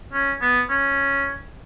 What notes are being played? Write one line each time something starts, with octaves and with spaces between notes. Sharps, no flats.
C#4
B3
C#4